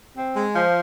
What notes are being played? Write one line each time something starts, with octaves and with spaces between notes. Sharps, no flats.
C4
G#3
F3